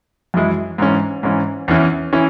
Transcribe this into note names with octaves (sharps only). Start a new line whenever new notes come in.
F#2 E3 G#3 E4
G#2 E3 C#4
G#2 E3 C#4
E2 E3 C#4 E4
E3 C#4 E4